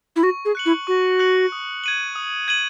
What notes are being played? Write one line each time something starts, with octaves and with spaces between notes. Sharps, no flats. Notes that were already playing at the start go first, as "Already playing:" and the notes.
E4
F#4 C#6
G#4
F#6 C#7 F#7
E4
F#4 C#6
F#6 C#7 F#7
D#6
G#6 D#7 F#7
D#6
G#6 D#7 F#7